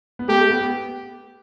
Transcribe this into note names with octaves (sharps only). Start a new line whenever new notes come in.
B3
A3 G4
B3